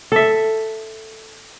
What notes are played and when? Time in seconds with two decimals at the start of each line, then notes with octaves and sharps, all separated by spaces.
0.12 A4 E5